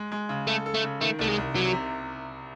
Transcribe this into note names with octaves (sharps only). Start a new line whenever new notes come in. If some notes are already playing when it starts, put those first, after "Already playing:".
Already playing: G#3
G#3
C#3
A3 A4
A4
A3
C#3
D#3 A3
C2 A3
G#3
C2
C3 F#3
C3